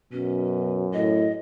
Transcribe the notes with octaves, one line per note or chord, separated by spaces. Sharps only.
F#2 B2 C#4
A2 D#5